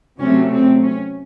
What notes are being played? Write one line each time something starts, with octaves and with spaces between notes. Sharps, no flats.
C3 F#3 A3 C4 C#4
C4
C#4